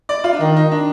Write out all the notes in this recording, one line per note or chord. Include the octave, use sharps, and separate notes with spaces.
D5
F4
D4
D#3 D#4
D#4
D4